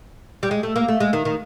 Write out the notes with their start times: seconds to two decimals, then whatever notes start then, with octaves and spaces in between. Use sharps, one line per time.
0.43 G3
0.51 G#3
0.63 A3
0.76 A#3
0.88 A3
1.00 G#3
1.13 D#3
1.25 D#3